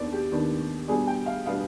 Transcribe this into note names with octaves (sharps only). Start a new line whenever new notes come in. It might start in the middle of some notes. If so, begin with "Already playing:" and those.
Already playing: D#2 D#3 B3 D4 D5
G4
D#2 D#3 B3 D4
B2 G3 B3 D4 G#4
G5
F5
B2 G3 B3 D4 F5